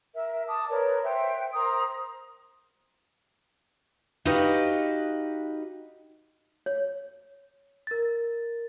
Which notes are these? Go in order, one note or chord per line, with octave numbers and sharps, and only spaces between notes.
A#4 E5
A5 D6 D#6
A#4 B4 C#5 D5
C5 E5 F#5 G5
A#4 C5 A#5 D#6
D#4 F#4 G4 B4 D#5 F5
C#5
A#4 A6